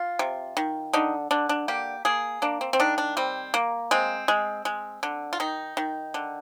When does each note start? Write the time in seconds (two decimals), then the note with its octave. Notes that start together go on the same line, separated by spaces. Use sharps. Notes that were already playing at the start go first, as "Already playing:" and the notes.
Already playing: F4
0.19 C3
0.57 D#3
0.93 D3 D#4
1.31 D3 D4
1.49 D4
1.68 A#3 G4
2.05 A#3 G#4
2.42 A#3 D4
2.61 C4
2.73 C4
2.80 D#3 D4
2.98 D4
3.17 G3 C4
3.54 A#3
3.91 G#3 C4
4.28 G#3
4.65 G#3
5.03 D3
5.33 F4
5.40 D#3 D#4
5.77 D#3
6.14 D3